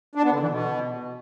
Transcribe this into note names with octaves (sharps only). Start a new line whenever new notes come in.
D4
B3
D3
E3
B2